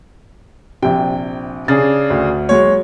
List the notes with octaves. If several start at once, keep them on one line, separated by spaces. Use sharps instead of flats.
A#1 C3 G5
C#3 D4 G#4 A6
D2
F#3 G#3 C#5